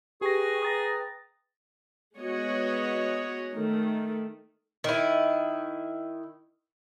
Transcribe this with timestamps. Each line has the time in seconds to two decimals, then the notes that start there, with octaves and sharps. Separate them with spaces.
0.21 G4 G#4 B4 G5 C#6 A#6
0.63 B4 G5 A#5 D#6 A6 A#6
2.17 G#3 B3 F#4 C#5 D#5
3.54 D#3 A3
4.84 D#3 E4